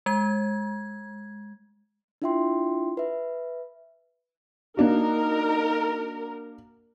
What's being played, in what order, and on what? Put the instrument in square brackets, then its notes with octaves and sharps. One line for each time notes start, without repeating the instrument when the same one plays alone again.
[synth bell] G#3 G#6
[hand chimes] D4 E4 F4 E5 G5 C6
B4 E5
[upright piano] A#3 D4 F#4 [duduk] D#4 [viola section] A#4